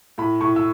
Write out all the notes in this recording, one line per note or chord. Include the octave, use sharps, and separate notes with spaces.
A2 B5
A2 C#6
E6